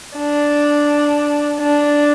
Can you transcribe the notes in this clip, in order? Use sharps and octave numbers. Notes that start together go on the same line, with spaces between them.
D4
D4